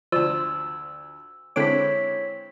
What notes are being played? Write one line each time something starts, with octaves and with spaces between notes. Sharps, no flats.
D2 F3 D5 E6
D3 G#3 C4 E4 C#5 D6 B6